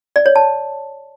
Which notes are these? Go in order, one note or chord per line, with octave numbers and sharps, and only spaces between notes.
D5
C#5
A5